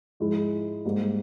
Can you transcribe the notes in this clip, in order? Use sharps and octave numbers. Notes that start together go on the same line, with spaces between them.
G#2 F3 G#3 E4
G#2 G3 A#3